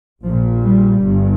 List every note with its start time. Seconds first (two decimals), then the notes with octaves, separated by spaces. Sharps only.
0.24 A#1 A#2 F3
0.63 G3
1.03 G1 G2